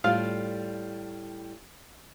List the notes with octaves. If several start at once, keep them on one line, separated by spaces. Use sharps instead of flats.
A2 G3 F4 F5